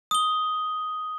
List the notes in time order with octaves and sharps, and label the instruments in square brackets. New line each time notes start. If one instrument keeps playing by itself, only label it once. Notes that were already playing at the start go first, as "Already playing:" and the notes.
[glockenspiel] D#6 G7